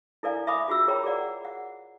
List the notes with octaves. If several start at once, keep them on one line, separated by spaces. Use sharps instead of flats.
E4 A4 A#4 D5 F5 G#5
E5 F5 G#5 B5 D6 D#6
F4 F#4 G#4 E6
G#4 A#4 C#5 G5 A#5 B5
G#4 A#4 D5 F#5
F#5